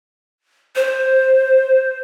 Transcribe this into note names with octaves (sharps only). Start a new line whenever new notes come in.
C5